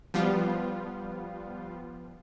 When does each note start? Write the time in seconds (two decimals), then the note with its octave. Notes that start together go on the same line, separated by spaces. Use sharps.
0.14 F3 G3 B3 F4